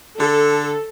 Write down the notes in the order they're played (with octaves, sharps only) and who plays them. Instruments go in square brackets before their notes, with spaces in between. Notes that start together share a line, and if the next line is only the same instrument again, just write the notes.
[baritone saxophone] D3 [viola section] A4